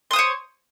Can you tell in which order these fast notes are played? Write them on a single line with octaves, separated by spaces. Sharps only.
C6 D#6 C5 C#5